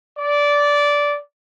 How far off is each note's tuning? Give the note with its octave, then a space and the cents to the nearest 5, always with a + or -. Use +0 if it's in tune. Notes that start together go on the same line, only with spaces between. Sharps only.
D5 -15